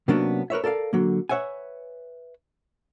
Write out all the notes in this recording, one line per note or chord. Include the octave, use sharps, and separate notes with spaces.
C3 F#3 A#3 B3 C#4 D4
A#4 B4 C#5 E5
A4 A#4 D5 F5
D3 F#3 A#3
B4 C#5 E5 F#5 G#5